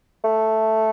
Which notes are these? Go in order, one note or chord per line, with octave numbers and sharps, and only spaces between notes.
A3